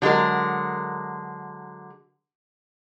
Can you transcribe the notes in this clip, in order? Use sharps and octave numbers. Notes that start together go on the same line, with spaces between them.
D3 F#3 G#3 A#4